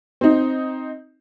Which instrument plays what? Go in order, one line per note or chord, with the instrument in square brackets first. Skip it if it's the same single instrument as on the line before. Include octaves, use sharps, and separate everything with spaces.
[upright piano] C4 D#4